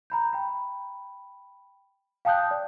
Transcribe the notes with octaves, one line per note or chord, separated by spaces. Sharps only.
A#5 B5 G6
G5 B5
F5 G5 A5 D#6 F#6 G6
D5